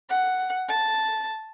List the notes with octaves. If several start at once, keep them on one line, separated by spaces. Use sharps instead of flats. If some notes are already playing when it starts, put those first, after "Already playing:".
F#5
A5